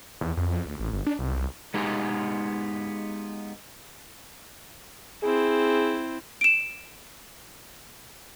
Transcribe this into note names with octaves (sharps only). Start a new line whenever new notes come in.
E2
F2
F2
D2
A1
G1
D4
C2
C2
G#3 B3 D#4 F4 G4 G#4
C4 E4 G#4
D7 E7